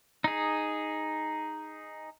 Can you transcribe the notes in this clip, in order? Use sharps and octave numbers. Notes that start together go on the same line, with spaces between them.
D#4 G#4